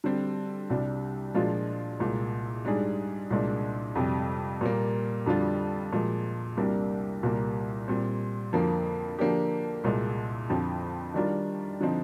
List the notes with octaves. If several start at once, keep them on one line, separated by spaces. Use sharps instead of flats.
D3 G3 C4
C2 C3 G3 D4
A#2 F3 G#3 D4 F4
C2 A#2 G#3
G#2 G3 D4 G#4
C2 A#2 G#3 D4
F2 C3 G3
A#2 G3 A#3
F2 D3 G3 D4 F4
A#2 F3 G#3
C2 C3 G3 A#3 D4
C2 A#2 G3 A#3
A#2 G3 C4
F2 D3 F3 A#3
D3 F3 A#3 D4 G4
C2 A#2 G#3
F2 D3 F3 C4
D#3 G3 D4 F4 A#4
D3 F3 C4 D#4